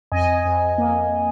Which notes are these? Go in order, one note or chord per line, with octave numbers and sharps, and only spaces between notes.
F2 D#5 G#5
F2
A#3